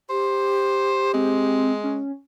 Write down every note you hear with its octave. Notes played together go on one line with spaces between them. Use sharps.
G4 C5
G#3 C4
C#4